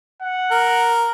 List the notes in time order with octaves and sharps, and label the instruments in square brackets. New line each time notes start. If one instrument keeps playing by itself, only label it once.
[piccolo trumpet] F#5
[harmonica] A#4